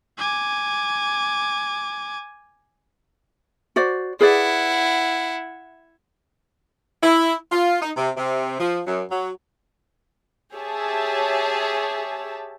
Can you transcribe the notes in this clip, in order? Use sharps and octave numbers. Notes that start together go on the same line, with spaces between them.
G#5 D6
F#4 C5 D5
E4 G#4 B4 D5 F#5
E4
F4
D#4
C3
C3
F3
F#2
F#3
G4 G#4 C#5 E5 A5